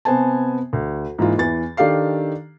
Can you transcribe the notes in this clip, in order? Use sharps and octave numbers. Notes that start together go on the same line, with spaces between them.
C3 B3 C5 G#5 A5
D2
G#2 E3 A#3 F4
E2 E3 A6
D#3 D4 G4 A4 F5 C7